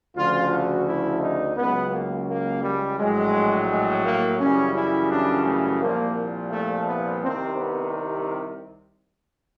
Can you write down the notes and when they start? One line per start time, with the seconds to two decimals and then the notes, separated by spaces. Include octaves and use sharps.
0.15 D2 C#3 F3 F4
0.51 F#4
0.87 E4
1.22 D#4
1.57 C#2 C#3 F#3 B3
1.93 A#3
2.28 A#3
2.63 G3
2.98 A#1 A2 F#3 G#3
3.70 G#3
4.05 A#3
4.40 F#2 C#3 E3 G3 C#4
4.75 E4
5.10 D4
5.46 A3
5.81 C2 A#2 F3 A#3
6.51 A3
6.87 B3
7.22 C2 C3 D#3 C4
7.58 B3